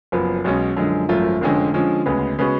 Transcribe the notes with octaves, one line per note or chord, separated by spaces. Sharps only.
F#1 F#2 F3 B3
B1 B2 G#3 C#4
F#2 D3 F3 G#3
G#1 F#2 F3 A3 F4
F1 F2 D3 G#3 C#4
D3 F3 G#3 C#4
D2 C#3 G#3 B3
C#3 G#3 B3 F#4